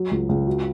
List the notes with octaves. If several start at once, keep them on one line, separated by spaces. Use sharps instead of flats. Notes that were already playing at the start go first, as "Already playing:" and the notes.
Already playing: F#3
C#2
C#2
F#4